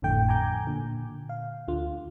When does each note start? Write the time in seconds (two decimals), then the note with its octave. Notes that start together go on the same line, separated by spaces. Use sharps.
0.02 G#1 F2 A2 D3 A3 G5
0.29 G#5 A#5 D6 G6
0.67 A#2 D3
1.29 F5
1.68 D2 D3 F4